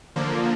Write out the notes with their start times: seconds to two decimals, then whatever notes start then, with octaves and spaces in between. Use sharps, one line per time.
0.16 D3 F3 A#3